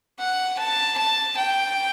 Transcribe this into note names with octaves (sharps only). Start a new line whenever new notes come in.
F#5
A5
A5
G5